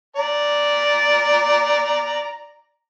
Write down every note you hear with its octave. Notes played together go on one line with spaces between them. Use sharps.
D5 A#5